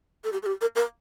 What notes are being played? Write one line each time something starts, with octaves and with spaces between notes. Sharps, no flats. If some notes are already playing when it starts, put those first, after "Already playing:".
A4
G4
A4
G4
A#4
A#4